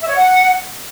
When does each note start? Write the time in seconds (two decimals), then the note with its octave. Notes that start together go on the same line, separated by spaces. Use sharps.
0.01 E5
0.08 C#5
0.16 F#5